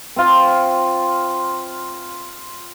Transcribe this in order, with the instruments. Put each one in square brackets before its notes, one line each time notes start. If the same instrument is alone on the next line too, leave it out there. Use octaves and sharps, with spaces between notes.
[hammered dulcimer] C4 F4